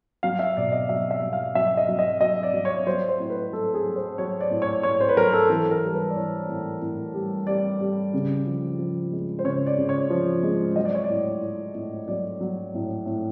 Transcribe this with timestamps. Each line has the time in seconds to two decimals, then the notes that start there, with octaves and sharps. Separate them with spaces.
0.23 F#3 F5
0.39 E5
0.57 B2 D5
0.72 D#5
0.89 F#3 E5
1.11 E5
1.22 F#3
1.33 F5
1.55 F#3 E5
1.77 D#5
1.88 F#3
1.99 D#5
2.20 F#3 D#5
2.43 D5
2.53 F#3
2.65 C#5
2.87 F#3 C5
3.09 C5
3.20 A2
3.30 B4
3.52 F#3 A4
3.74 G#4
3.86 F#3
3.96 C5
4.18 F#3 C#5
4.41 D5
4.51 A2
4.62 C#5
4.83 A2 C#5
5.01 C5
5.09 B4
5.17 F#3 A#4
5.33 A4
5.50 E3 A4
5.71 A#4
5.83 G3
5.94 B4
6.10 D5
6.16 E3 C#5
6.48 A2
6.82 A2
7.14 G3
7.47 G3 D5
7.81 G3
8.14 C#3
8.47 F3
8.79 F3
9.12 G#3
9.39 C5
9.44 C#3 C#5
9.67 D5
9.78 C#3
9.89 C#5
10.10 F3
10.43 G#3
10.76 F#3 D#5
10.85 D5
10.95 C#5
11.04 A2 D5
11.42 A2
11.75 A2
12.08 F#3 D5
12.41 F#3
12.74 A2
13.06 A2